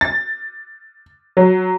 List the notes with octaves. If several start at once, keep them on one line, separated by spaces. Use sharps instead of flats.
A6
F#3